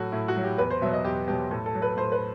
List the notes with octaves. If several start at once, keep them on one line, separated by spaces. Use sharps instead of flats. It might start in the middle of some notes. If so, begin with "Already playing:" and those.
Already playing: A2 F#3 F#4 A4
A2 E4
F#4
F#3
G4
E2 B4
C5
B2 F#3 E5
D#5
E2 G4
B2 F#3 G4
A2 A4
A4
F#3
B4
A2 C5
B4